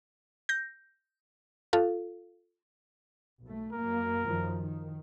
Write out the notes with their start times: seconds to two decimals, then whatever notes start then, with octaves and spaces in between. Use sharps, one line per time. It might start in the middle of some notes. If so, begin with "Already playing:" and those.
0.49 G6 A#6
1.73 F4 A4 F5
3.41 B1 A3
3.73 F#2 A#3 A#4
4.26 F#2 D#3 F3
4.59 D#3